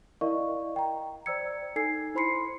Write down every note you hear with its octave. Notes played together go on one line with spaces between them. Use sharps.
E4 A#4 D5 D#5 F5 C#6
G5 A#5
C5 D5 A#5 E6 G#6 C#7
D#4 A4 G#5 E6 G#6 C7
E4 C5 B5 C6 C7 C#7